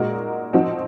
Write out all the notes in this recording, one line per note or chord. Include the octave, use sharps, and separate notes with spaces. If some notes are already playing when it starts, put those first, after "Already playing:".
Already playing: A#2 G#3 D#4 F#4 A#4
F3 C4 D#4 F#4